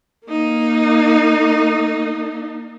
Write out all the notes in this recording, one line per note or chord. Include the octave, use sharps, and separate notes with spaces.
A#3 D#4